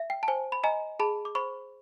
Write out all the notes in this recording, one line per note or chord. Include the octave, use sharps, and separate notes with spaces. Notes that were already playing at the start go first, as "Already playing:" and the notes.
Already playing: E5
G5
A5
C5 G#5
B5
D#5 G#5 A#5
G#4 A5 B5
D6
C5 B5 C#6